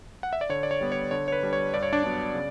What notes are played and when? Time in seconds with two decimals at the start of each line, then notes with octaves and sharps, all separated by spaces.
0.23 F#5
0.33 E5
0.41 D5
0.49 D3 C#5
0.63 D5
0.71 C#5
0.81 G3 B3
0.92 C#5
1.11 D3 C#5
1.28 C#5
1.32 B4
1.43 G3 D4
1.53 C#5
1.74 G2 D5
1.83 C#5
1.93 D4 D5
2.04 F#3 B3 D4
2.35 C#3